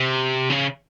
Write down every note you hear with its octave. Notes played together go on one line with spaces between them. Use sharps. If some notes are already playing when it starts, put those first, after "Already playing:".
Already playing: C3
C#3